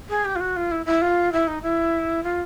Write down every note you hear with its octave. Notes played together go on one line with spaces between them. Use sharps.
G#4
G4
F4
F#4
F4
E4
E4
F4
E4
D#4
E4
F4